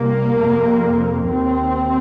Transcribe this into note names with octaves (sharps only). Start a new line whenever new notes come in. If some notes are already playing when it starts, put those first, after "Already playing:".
Already playing: C2 C3 A#3
F2 C3
D#2 C4